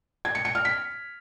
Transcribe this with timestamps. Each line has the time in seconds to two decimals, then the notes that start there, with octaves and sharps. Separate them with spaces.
0.25 G#6
0.35 C#7
0.45 C#7
0.55 F6
0.65 B6